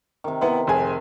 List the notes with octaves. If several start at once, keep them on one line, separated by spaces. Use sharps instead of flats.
C3 D#3
B3 E4 C6
F1 G#4 G#5